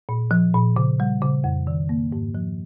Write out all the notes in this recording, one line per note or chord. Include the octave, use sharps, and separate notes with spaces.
A#2
F3
A#2
C#3
G3
C#3
F2
D#3
A#3
G#2
F3